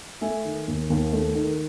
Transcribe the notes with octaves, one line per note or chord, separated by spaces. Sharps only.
A3 E5 G#5
D#3
D#2
D#2
A3
D#3